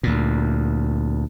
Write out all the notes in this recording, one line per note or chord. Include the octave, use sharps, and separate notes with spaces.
D2 A#2